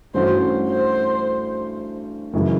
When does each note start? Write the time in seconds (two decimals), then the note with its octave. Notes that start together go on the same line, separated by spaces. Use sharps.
0.14 G2 E3 A3 C#4 F#4 C5
0.69 C5
2.33 F#2 C#3 E3 G#3